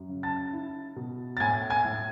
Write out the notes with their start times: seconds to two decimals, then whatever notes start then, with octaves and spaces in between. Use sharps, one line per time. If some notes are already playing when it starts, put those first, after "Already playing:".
Already playing: F#2
0.09 C#3
0.23 A5 A6
0.53 E4
0.96 B2
1.37 A6
1.40 A2 G#5 G#6
1.70 G#5 G#6
1.85 A2